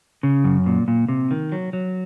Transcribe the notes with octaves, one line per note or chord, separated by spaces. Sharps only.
C#3
F#2
A#2
A#2
C3
D#3
F#3
F#3